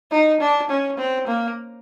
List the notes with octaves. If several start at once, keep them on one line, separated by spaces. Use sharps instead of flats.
D#4
D4
C#4
C4
A#3